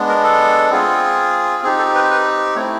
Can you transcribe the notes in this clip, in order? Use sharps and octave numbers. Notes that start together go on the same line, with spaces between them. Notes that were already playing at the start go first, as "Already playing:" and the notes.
Already playing: G#3 B3 D4
A#4
A4
C4 F4 G#4
C4 D#4 G4 G#4
A4
B4
B4
A3 C4 E4 C#5